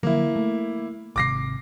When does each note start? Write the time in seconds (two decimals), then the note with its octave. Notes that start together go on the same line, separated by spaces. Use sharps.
0.03 D3 F3 F#3 A#3 E4
0.36 A3
1.16 G#1 C3 D6 A#6 C7